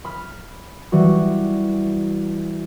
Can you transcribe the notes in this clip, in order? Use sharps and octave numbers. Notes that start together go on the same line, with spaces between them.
B5 F6
E3 G3 F#4